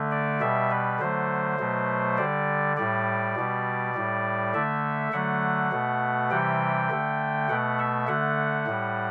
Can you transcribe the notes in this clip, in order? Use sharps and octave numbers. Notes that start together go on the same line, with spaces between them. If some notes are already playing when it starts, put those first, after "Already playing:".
Already playing: D3 A3
D5
B2 G3 E5
B4
D3 F#3 A3 C5
B2 F#3 A3
D3 G3 D5
A2 G3 D5
B2 G3
A2 G3
D3 A3 E5
D3 F#3 A3 F#5
B2 A3
C3 E3 G3 G5
D3 A3
B2 A3 F#5
E5
D3 A3 F#5
A2 G3